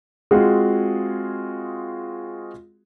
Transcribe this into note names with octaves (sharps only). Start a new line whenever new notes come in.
G#3 C4 F4 F#4 G#4